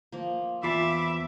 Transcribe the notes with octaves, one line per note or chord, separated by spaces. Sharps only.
F3 A#3
E2 F4 D5 E5 B5 D6